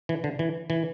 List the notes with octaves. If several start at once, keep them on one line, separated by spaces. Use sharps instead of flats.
E3
D3
E3
E3